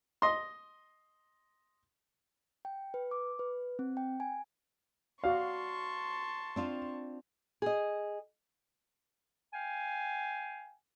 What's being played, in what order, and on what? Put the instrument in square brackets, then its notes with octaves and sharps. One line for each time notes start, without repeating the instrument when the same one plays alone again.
[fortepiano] D#5 C6
[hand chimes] G5
B4
D6
B4
C4
G5
G#5
[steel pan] F#4 D5 [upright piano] F5 [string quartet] A5 C6 C#6
[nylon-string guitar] C4 D4 F4
G#4 D#5
[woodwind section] F5 G5 G#5